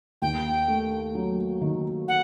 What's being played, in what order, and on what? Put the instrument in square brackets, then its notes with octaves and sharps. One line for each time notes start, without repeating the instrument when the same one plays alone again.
[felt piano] D#2 [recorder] G5
[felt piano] A3
F#3
D#3
[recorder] F#5